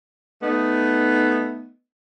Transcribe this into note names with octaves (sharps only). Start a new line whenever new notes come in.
A3 B3 D#4